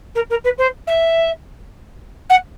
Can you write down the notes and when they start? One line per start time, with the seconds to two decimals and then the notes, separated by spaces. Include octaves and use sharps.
0.15 A#4
0.30 A#4
0.44 B4
0.58 C5
0.87 E5
2.30 F#5